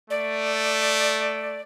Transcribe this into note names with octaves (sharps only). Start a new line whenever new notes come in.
A3 D5